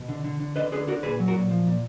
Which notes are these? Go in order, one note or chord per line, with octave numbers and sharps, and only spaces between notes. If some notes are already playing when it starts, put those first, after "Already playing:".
Already playing: B2
D3
D3
D3
D3 B4 D#5
D3 G#4 B4
D3 F#4 A#4
A#2 G#4 B4
F#3
F#4 A#4
A#2
F3
A#2